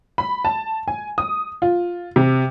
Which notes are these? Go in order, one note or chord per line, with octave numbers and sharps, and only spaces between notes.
B5
A5
G#5
D#6
F4
C3